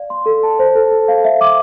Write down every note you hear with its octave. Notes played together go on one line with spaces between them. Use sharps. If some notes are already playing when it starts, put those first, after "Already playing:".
Already playing: D5 F5
C6
A4
A5
C5
A4
A4
F5
E5
D6